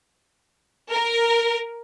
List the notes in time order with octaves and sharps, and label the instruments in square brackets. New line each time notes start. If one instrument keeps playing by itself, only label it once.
[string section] A#4